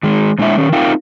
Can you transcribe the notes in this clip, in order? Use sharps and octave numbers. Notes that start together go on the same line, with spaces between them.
D#3 G#3
A#2 G#3 D4 E4 A4 E5
D#3 C#4
C4 D#4 F4 A#4 F5 G5